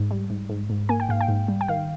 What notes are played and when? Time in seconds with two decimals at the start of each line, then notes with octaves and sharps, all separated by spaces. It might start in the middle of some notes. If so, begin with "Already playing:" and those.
Already playing: G#2
0.11 G3
0.30 G#2
0.49 G#2
0.70 G#2
0.89 A#3 G#5
1.00 G5
1.09 G#2 F5
1.21 G5
1.28 G#2
1.48 G3
1.61 G5
1.68 D#3 F5